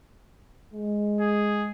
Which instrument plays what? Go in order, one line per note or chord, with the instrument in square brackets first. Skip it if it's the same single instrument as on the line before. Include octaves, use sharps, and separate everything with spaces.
[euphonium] G#3
[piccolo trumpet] G#4